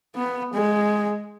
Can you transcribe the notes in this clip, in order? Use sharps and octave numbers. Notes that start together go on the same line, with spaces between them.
B3
G#3